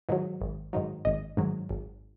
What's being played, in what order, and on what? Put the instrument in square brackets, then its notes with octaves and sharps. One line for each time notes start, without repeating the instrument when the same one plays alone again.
[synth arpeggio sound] G#2 D#3 F#3
G#1
G#2 D#3 F#3
G#1 D#5
G#2 D#3 F#3
G#1